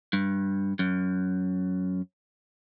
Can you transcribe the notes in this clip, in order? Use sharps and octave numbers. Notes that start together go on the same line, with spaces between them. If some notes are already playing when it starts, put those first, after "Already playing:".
G2
F#2